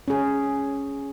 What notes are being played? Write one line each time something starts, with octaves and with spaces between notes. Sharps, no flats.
C#4 G#4